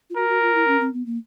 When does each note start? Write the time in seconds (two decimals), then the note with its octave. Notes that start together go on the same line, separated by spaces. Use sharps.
0.10 F4
0.16 F#4 A#4
0.29 F#4
0.42 F4
0.55 E4
0.67 C#4
0.80 C4
0.93 B3
1.06 A#3